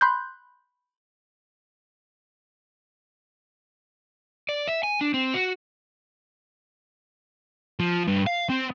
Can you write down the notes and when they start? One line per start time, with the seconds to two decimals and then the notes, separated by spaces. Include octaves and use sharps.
0.01 B5 C6 F#6 G6
4.49 D5
4.68 E5
4.83 G#5
5.01 D4
5.14 C4
5.34 F#4
7.80 F3
8.07 G2
8.27 F5
8.50 C4